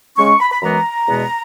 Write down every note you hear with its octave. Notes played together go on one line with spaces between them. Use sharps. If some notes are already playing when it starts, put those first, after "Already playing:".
C#3 G#3 C#4 C#6
B5
B5
F#2 E3 G#3 B3 A#5
E2 B2 G#3 B3